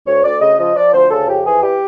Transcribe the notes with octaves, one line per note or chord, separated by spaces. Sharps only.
D2 C#5
D2 D5
C#3 D#5
F3 D#5
F3 D5
D2 C5
C#3 A4
F2 G4
E3 G#4
G4